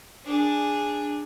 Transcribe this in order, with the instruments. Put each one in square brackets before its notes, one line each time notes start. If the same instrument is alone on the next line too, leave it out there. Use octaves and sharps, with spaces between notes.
[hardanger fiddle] D4 G#4